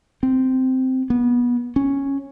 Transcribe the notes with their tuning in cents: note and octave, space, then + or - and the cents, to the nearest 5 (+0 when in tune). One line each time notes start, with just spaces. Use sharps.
C4 -10
B3 -25
C#4 -5